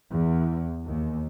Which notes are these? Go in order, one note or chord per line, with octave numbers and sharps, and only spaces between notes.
E2
D#2